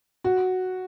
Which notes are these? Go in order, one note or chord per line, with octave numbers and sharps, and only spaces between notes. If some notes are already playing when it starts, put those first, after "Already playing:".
F#4